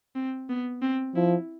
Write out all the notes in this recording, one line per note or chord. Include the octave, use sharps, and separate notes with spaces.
C4
B3
C4
F3 E4